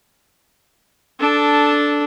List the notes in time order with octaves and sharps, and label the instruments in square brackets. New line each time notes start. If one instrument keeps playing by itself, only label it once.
[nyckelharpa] D4 A4